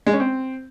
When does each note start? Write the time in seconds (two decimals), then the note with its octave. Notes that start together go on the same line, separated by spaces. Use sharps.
0.07 G#3
0.13 C#4
0.20 C4